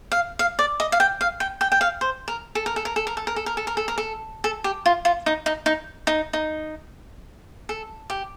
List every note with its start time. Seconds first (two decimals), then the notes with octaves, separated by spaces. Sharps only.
0.12 F5
0.39 F5
0.59 D5
0.80 D#5
0.92 F5
1.00 G5
1.21 F5
1.40 G5
1.61 G5
1.72 G5
1.81 F5
2.01 C5
2.28 A#4
2.55 A4
2.66 A#4
2.76 A4
2.85 A#4
2.96 A4
3.07 A#4
3.17 A4
3.27 A#4
3.36 A4
3.46 A#4
3.57 A4
3.67 A#4
3.77 A4
3.88 A#4
3.98 A4
4.44 A4
4.64 G4
4.86 F4
5.05 F4
5.26 D#4
5.46 D#4
5.66 D#4
6.07 D#4
6.33 D#4
7.69 A4
8.10 G4